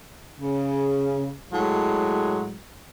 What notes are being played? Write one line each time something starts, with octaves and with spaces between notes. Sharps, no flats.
C#3
A2 F#3 G#3